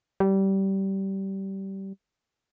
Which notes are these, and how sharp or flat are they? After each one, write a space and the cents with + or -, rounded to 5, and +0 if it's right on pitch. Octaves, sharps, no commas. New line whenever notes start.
G3 -20